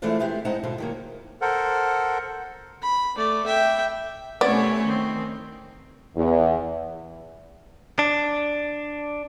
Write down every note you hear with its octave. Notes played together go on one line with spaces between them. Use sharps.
E3 G#3 A3 C4 D4 F4
G#3 B3 C4 G4
A2 G#3 C4 D#4 F#5 A#5
G#2 B2 D3 F4
D#3 F#3 A#3
A4 A#4 C5 F#5
B5
A3 D5
E5 G5
C3 A3 B3 C#4 E4 C#5 D5
D#3 C4
E2
D4